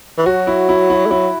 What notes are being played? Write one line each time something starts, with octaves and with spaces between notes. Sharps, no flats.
E3
F#3 F#4
E4
E4
E4
A3
F#3 E4